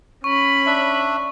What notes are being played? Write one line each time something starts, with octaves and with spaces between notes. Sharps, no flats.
C#4 B5 C#6
D4 E5